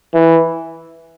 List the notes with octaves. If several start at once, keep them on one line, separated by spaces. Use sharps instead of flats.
E3